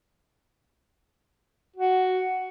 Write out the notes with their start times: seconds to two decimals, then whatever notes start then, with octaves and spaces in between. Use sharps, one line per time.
1.76 F#4